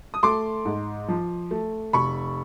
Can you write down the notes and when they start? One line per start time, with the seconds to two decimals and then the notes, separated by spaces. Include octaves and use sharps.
0.14 D#6
0.23 A3 C6 D6
0.65 G#2
1.08 F3
1.51 A3
1.93 F1 B5 C#6